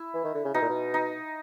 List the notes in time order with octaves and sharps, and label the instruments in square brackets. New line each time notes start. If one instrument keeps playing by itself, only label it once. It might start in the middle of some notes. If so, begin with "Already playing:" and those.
Already playing: [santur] E4
[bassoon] E3
D#3
D3
C#3
[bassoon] B2 [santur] D#4
[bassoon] A#2
B2
[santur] D#4